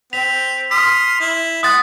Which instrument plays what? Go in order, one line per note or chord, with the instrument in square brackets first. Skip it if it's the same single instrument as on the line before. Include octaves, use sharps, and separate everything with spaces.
[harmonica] C4 [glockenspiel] B6 F7
[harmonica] C6 D#6 F6 [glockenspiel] B6
[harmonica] E4
[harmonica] G#3 F#5 [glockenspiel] D#6 A6